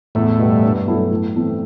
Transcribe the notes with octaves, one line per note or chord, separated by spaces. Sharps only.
E2 A2 A3
B2 G3
G2
F#3 A3 E4 A4
A2
E3 A3 C4